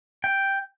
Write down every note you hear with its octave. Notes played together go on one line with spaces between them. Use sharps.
G5